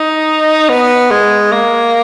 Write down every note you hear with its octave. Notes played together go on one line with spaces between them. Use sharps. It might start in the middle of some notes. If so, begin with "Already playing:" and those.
Already playing: D#4
B3
G#3
A#3